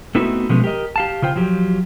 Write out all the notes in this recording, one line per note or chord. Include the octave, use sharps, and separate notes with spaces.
A3 B3 C4 D#4 E4 F#4
B2 F3 G#3 A3 B3 C#4
G4 A#4 D#5
G4 F5 A5
C#3 F4 C5 G5
F3 F#3 G4